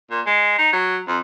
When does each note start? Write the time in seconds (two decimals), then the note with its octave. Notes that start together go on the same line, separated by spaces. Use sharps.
0.11 A#2
0.26 G#3
0.58 D#4
0.73 F#3
1.08 F2